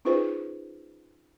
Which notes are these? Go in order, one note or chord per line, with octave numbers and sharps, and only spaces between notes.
C#4 D#4 F4 G#4 B4 C5